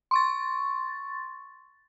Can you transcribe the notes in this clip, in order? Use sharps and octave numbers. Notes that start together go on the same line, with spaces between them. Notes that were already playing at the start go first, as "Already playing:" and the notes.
C6 C#6 A6